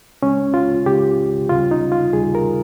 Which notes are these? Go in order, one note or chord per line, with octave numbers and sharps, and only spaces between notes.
C#2 C#3 G#3 C#4
F4
C#2 C#3 G#3 G4
D#2 C#3 G3 F4
D#4
F4
D#2 C#3 G3 G#4
A#4